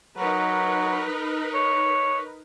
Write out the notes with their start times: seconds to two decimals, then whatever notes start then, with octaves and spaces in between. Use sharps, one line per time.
0.18 F#3 D#4 A#4 B4
1.54 C#5